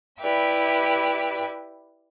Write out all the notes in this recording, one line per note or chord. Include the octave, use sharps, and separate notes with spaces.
E4 G4 B4 D5 E5